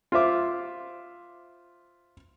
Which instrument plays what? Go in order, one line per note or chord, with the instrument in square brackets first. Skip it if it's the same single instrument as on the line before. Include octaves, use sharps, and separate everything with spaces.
[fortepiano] F4 C5 E5 D6